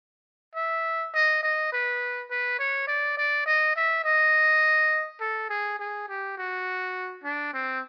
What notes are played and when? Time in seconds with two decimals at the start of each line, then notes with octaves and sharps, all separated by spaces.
0.55 E5
1.14 D#5
1.43 D#5
1.72 B4
2.30 B4
2.59 C#5
2.88 D5
3.17 D5
3.46 D#5
3.76 E5
4.04 D#5
5.21 A4
5.50 G#4
5.79 G#4
6.09 G4
6.37 F#4
7.24 D4
7.54 C4